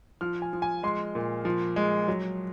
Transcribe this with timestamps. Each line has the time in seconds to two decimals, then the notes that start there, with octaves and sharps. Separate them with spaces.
0.21 F3 F6
0.42 G#5
0.53 F3
0.62 G#5
0.83 G#3 C6
1.15 A#2
1.45 F3
1.76 G#3
2.08 F#3